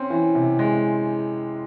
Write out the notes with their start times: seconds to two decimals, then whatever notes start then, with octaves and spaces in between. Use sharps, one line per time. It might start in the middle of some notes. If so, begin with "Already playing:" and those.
Already playing: C4 C#4
0.10 E3
0.35 C3
0.59 G#3